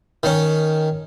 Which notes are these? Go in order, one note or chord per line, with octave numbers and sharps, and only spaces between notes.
D#3 C#4